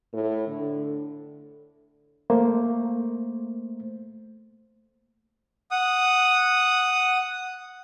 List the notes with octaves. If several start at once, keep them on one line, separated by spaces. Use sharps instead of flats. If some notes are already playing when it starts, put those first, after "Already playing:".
A2
D3
A3 A#3 C5
F#5 D#6